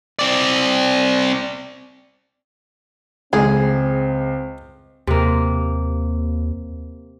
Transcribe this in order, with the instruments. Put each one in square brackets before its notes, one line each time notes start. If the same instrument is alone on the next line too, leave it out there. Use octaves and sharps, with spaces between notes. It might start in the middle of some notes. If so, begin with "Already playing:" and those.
[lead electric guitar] C4 D5
[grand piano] C#2 [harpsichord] A2 G#3 [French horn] C4 [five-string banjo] G#4
[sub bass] D#2 [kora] C3 A#3